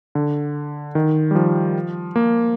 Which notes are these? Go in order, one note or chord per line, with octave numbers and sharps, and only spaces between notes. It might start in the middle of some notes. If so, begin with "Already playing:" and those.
D3
D#3
G3
F3
A#3